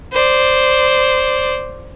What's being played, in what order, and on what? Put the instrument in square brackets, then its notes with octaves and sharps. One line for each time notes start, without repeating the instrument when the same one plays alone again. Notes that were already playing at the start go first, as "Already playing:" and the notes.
[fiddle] C5 D5